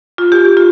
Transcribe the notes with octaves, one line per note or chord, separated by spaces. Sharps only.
F4
G4
F4